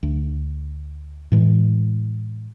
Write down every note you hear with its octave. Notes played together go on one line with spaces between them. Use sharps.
D2
A2 E3 G#3